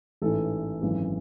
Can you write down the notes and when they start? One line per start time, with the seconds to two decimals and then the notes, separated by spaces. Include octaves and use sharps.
0.22 A1 G#2 E3 A4
0.82 G#1 F#2 E3